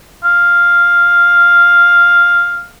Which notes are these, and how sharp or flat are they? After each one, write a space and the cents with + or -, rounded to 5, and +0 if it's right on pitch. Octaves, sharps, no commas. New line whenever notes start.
F5 +0